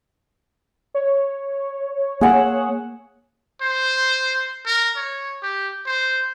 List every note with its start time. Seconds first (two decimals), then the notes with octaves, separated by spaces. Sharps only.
0.94 C#5
2.21 A#3 G#4 F#5 E6
3.62 C5
4.66 A#4
4.96 C#5
5.43 G4
5.86 C5